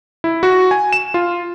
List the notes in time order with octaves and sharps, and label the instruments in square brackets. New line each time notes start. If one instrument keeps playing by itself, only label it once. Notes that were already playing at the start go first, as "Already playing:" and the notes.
[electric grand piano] E4
F#4
G#5
E7
F4